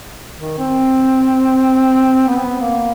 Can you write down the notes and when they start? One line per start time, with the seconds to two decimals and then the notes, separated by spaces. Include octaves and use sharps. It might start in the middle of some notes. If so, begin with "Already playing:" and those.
0.38 D#3
0.58 C4
2.28 B3
2.60 A#3